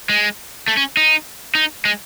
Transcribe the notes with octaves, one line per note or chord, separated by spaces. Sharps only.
G#3
A3
C#4
D#4
D#4
G#3